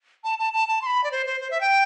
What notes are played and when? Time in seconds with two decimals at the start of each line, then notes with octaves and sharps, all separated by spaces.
0.24 A5
0.39 A5
0.53 A5
0.68 A5
0.82 C6
0.86 B5
1.04 D5
1.12 C5
1.26 C5
1.41 C5
1.51 E5
1.61 G5